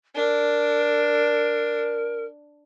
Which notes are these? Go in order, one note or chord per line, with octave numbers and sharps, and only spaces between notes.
D4 A#4